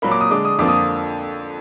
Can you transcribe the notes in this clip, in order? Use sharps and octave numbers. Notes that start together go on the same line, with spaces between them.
A#2 F#3 A#3 B5
D6
D#6
D3 G#3 D4 D6
D#6
F2 D3 F3 A#3 D6
D#6